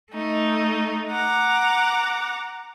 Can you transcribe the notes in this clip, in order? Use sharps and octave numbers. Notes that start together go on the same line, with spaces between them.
A3 D#4
F#5 A#5 D6